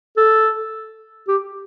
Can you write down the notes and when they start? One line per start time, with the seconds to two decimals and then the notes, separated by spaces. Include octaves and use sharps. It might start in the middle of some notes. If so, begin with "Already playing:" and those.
0.17 A4
1.28 G4